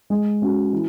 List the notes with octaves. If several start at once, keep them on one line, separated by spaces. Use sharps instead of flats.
G#3
C#4 F#4
E3